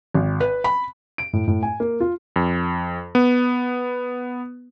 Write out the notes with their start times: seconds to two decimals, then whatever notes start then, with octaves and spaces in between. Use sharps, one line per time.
0.14 G#1
0.40 B4
0.64 B5
1.18 D7
1.33 A2
1.47 A2
1.63 G#5
1.80 A#3
2.00 F4
2.36 F2
3.15 B3